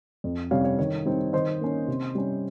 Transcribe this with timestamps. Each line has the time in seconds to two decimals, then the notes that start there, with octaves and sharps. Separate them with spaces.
0.24 F2
0.51 C3 G3 C#4 C#5 F5
0.64 C#5
0.79 D#3 C#5
1.06 G3 C4 D#4
1.33 D#3 C5 D#5
1.61 A#3 C#4
1.88 C3
2.15 G3 C#4